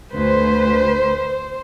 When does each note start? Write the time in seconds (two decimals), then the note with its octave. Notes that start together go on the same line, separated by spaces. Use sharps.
0.13 D2 B4 C5